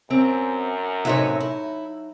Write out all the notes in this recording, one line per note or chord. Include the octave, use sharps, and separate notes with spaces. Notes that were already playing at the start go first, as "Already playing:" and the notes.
F#2 C4
A2 C3 F#3 D#4 C#5 E5
E4